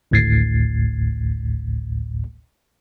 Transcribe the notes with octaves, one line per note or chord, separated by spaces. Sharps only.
G#1 D2 A2 G#6 A6 C7